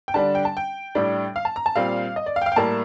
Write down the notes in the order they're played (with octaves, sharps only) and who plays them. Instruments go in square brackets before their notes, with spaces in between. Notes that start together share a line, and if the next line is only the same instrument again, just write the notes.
[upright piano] G5
D3 G3 D4 A5
G5
A5
G5
A2 G3 D4
F5
A5
A#5
A5
A#2 G3 C4 F5
D#5
D5
F5
G5
F5
G5
A2 G3 A#3 A5